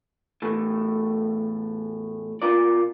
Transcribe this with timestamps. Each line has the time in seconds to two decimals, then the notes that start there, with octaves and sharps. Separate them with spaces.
0.42 E2 A2 A3
2.42 B2 F4 A#4 D5